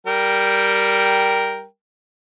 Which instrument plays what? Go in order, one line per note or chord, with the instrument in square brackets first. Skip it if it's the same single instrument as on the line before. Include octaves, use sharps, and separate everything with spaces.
[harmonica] G3 A#4 G5